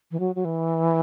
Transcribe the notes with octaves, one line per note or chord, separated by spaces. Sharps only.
E3
F#3
F#3
E3